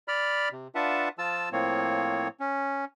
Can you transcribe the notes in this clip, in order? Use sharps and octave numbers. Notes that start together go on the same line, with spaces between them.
D5 B5 F6
C3
D4 F4 B4 E5 F#5 A5
F3 F4 A5 E6
A2 F3 A#3 C4 C#5
C#4